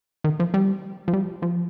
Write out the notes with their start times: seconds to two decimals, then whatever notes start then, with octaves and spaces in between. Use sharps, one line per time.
0.24 D#3
0.40 F3
0.54 G3
1.08 F3
1.13 G3
1.42 F3